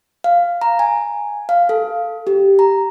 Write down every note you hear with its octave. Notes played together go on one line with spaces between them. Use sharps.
F5
A#5
G#5
F5
A4
G4
A#5